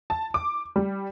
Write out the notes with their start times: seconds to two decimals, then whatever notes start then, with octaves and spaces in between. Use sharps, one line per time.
0.10 A5
0.34 D6
0.76 G3